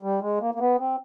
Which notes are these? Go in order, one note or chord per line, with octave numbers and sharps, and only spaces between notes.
G3
G#3
A#3
A#3
B3
C4